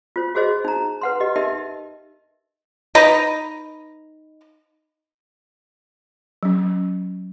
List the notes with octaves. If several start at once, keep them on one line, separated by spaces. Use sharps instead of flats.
F4 C5
F#4 G#4 C5 D#5
D#4 A#5
B4 F#5 C6
G4 D#5
D#4 G4 A#4 D#5 E5
D#4 B4 D#5 A#5
F#3 C#4